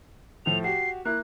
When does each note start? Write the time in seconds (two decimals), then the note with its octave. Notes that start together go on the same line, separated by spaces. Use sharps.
0.46 A2 F3 A3 F7
0.64 F#4 G4 C7
1.05 A#3 E4 F#6